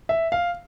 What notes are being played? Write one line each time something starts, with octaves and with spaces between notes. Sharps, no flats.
E5
F5